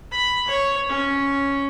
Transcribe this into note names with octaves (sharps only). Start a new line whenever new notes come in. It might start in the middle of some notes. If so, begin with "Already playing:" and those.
B5
C#5
C#4